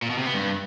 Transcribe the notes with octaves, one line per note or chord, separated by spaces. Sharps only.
A#2
B2
C3
B3
G2